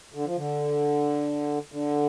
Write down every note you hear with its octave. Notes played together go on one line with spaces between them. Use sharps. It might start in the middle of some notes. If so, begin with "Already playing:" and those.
D3
F3
D3
D3